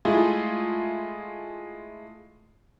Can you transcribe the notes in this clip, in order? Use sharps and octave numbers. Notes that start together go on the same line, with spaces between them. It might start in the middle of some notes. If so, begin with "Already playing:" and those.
G#3 A3 E4 F4 G#4